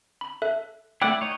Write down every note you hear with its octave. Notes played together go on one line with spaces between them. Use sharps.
B5
A4 E5 F#6
A3 E4 D5 F#5 G5
D#4 C#5